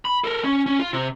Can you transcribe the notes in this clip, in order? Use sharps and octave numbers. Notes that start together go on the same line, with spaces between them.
B5
A4 A#4
C#4
C#4
F4
C3